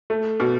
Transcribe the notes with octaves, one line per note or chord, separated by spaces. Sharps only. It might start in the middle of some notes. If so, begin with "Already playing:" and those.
A3
B2